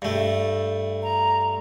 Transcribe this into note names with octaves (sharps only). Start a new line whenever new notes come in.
G2 A3
A#5